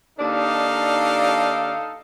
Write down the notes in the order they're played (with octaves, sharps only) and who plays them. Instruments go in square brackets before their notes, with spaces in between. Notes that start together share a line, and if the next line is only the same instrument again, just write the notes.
[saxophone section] D#2 D4 D5 [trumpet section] D#4 A4 F5